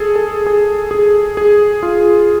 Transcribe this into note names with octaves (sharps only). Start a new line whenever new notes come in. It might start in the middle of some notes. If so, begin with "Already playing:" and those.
Already playing: G#4 A4
A4
G#4
G#4
G#4
F4